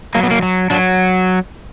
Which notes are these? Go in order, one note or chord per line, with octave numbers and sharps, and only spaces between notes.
F#3 A#3
B3
A#3
F#3
F#3 D4